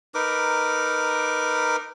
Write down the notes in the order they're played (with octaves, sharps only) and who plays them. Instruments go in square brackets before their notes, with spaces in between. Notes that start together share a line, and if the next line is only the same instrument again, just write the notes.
[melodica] D#4 A#4 B4 D6